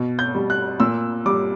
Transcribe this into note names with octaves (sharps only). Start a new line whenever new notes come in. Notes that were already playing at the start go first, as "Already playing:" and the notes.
Already playing: B2
G6
G3
F#6
A#2 E6
G3 D6